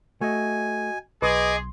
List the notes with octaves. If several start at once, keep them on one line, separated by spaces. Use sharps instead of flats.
A3 F#4 D#5 G#5
B1 G#4 B4 D#5 C6 D6